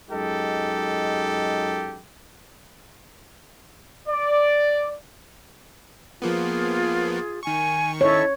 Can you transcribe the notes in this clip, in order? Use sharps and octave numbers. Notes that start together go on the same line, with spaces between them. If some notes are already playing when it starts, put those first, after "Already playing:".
F#2 G#3 D#4 G4 A4
D5
F3 A#3 B3 F4 G#4
D#3 G#5 C#6
E4 A4 C#5 D#5